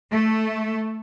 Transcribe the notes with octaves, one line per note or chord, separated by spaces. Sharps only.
A3